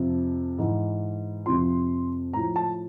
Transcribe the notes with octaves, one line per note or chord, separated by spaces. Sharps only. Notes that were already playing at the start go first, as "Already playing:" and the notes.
Already playing: F2 C3 F3
G#2 E3
F2 C3 F3 C6
A2 F3 A#5
A5